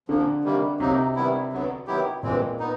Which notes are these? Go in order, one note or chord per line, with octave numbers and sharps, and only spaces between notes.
A#2 D3 F3 A#3
C3 D#3 G3 A#3
C3 F#3 A#3 D#4
D#3 G3 B3 E4
D3 F#3 B3
D#3 F#3 B3 E4 G4
G2 A#2 E3 G#3 C4
B3 D#4